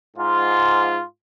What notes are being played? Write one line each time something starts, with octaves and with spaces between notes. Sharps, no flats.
G#2 F4